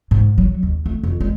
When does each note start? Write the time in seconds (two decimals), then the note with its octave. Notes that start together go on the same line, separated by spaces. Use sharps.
0.11 G#2
0.38 F#3
0.63 D#2
0.86 A3
1.03 F2
1.20 G#3